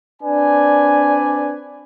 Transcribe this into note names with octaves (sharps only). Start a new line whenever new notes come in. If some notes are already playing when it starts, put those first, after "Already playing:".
C4 D4 B4 D5 G#5